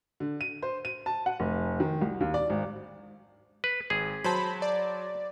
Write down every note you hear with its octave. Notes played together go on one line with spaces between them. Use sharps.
D3
D#7
C5
D#7
A5
F#5
F1
D#3
C2
D#2
D5
G#1
B4
G#1 G#4
F#3 C5 A5 B5
D5